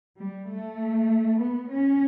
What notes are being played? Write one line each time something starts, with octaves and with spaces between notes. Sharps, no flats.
G3
A3
B3
C#4